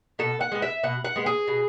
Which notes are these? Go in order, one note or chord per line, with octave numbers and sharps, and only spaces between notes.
B2 A4
F#5
G#3 B3
E5
B2 F#5
F#5
G#3 B3
G#4
B2